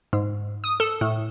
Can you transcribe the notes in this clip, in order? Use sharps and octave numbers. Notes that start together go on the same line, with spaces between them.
G#2
D#6
A4
A2